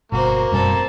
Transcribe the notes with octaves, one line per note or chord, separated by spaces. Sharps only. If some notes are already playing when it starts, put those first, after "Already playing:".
G1 B2 A#3 F#4 C5
F#2 B2 G3 C4 A4